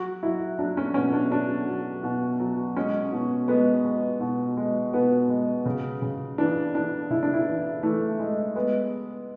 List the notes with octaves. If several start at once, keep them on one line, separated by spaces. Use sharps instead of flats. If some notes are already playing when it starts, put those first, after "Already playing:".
Already playing: F#3 F#4
F#3 E4
F#3 D4
C#4
B2 C#4
D4
F#3 D4
F#3
B2
F#3
G#3 C#4
B2
G#3 B3
G#3
B2
G#3
B2 B3
G#3
C#3
C#3
E3 D4
E3 D4
C#3 E4
D4
E4
E3
E3 A3
G#3
G#3 B3